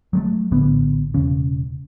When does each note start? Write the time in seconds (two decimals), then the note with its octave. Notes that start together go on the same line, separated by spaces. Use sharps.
0.13 F#3 G#3 A3
0.51 A#1 A2 D3 B3
1.14 E1 C#3 C#4